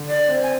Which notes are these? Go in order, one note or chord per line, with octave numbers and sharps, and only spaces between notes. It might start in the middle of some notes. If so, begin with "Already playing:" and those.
Already playing: D3
D5
C4
G#5